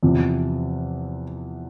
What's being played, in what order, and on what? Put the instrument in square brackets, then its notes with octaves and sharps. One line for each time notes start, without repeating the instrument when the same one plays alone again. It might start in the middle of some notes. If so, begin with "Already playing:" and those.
[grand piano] E2 C3 F3